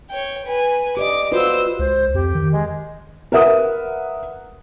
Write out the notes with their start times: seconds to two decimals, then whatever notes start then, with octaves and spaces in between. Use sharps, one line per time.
0.10 C#5 G5
0.46 B4 G#5
0.97 G4 D5 D#5 D6
1.32 F4 F#4 B4 C5 E6
1.79 C#2 C5
2.14 F2 G4
2.35 D#3
2.52 G#3
3.32 A#4 B4 E5 F#5 D#6